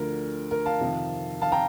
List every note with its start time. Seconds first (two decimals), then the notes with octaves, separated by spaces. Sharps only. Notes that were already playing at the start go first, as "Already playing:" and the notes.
Already playing: D2 D3 F3 A#4
0.51 A#4
0.66 F5 A5
0.81 F2 C3 D#3
1.42 F5 A5
1.52 G5 A#5